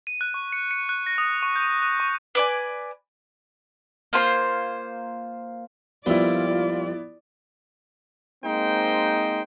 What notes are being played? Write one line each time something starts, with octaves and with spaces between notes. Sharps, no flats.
D#7
F#6
C#6
C#7
C#7
F#6
A#6
D#6
C#6
G6
F#6
C#6
B4 D5 G#5
A#3 F4 C5 C6
F2 A#2 G3 B3 E4 F4 D5
G#3 A#3 C4 D#4 C5 G5